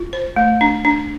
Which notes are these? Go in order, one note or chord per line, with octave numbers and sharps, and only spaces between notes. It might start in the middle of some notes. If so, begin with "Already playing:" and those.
Already playing: F4
C5
A3
D4
D4